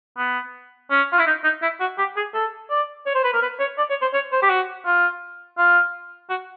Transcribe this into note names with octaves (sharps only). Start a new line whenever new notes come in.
B3
C#4
F4
E4
D#4
D#4
E4
F#4
G4
G#4
A4
D5
C#5
C5
B4
A#4
B4
C#5
D5
C#5
C5
C#5
C5
G4
F#4
F4
F4
F#4